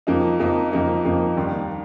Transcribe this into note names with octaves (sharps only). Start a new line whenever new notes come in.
F2 F3 A#3 D#4
F2 F3 A#3 D#4
F2 F3 A#3 D#4
F2 F3 A#3 D#4
D#2 D#3 G3